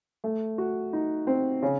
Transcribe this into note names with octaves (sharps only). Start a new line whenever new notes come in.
A3
F#4
D#4
C4
C#3